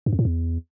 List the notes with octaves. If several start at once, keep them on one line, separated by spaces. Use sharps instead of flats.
G2
F2
A2
E2